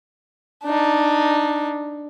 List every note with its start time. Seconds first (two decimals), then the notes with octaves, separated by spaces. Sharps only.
0.64 D4 D#4